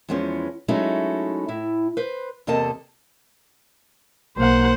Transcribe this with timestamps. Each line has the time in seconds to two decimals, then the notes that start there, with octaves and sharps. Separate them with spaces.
0.09 E2 F3 G#3 B3 C#4
0.68 F#3 G#3 A3 C#4 D#4 E4
1.48 A2 E4
1.97 B4 C5
2.47 E2 C3 A#3 A4 D#5 A5
4.37 B1 A#3 C5 F#5